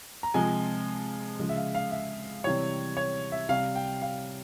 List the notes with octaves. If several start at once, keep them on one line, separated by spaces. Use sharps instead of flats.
A#5
C3 F3 G#3 G#5
C#3 F3 G#3
E5
F5
F5
E5
C3 E3 G3 C#5
C#5
E5
C3 G3 F5
G5
F5